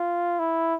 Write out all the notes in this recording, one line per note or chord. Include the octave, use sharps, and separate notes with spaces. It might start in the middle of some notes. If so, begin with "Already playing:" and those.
Already playing: F4
E4